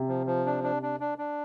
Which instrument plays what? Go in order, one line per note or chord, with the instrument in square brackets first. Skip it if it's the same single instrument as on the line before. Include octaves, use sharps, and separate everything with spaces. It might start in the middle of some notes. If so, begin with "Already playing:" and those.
Already playing: [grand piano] C3
[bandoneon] F3
F3
D4
D4
D4
D4
D4